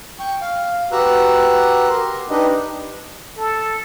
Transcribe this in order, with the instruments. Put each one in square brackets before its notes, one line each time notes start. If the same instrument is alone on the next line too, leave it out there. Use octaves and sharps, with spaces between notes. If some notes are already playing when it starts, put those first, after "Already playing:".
[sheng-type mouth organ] G5 C#6
F5
F#4 G4 B4 A#5 E6 F#6
G4 A#4 C6
D4 D#4 G4 B4 D#5
[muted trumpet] A4